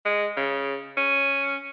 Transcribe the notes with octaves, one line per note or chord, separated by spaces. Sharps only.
G#3
C#3
C#4